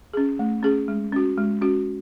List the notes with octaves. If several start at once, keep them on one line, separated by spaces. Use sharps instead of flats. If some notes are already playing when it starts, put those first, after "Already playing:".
C#4 G#4
A3
C#4 G#4
G#3
C#4 F#4
G#3
C#4 F#4